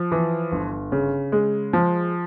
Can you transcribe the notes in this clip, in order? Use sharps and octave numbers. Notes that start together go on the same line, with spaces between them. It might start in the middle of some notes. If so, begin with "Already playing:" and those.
Already playing: F3
E3
G1
C#3
G#3
F3